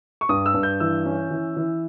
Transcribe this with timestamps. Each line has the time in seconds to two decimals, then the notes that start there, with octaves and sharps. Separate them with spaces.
0.21 C#6
0.29 G2 D#6
0.46 E6
0.54 G2
0.63 G6
0.80 E3 E6
1.05 C#4
1.31 E3
1.57 E3